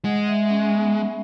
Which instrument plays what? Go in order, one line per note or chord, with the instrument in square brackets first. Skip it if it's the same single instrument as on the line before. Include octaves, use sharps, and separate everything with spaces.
[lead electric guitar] G#3 [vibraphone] F#5
[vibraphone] E5
C#4
B3
G#3